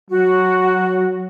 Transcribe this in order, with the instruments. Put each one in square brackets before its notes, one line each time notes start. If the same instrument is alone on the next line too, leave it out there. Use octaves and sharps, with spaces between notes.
[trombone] F#3 [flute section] F#4